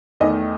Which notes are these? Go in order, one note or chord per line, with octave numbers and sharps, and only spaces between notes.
E2 D#3 A3 D#5